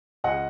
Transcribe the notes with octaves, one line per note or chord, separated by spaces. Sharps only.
C#2 D#5 F#5